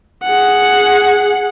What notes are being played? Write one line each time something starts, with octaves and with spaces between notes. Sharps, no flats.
G#4 F#5